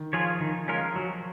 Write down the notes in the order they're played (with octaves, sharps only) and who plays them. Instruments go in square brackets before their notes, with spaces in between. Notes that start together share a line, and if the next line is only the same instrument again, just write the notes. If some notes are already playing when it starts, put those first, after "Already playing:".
Already playing: [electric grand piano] D#3
[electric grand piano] F3 [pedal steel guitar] F4 G#4 C#5
[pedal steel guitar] D#3
G#3 C#4 F4 A#4
F#3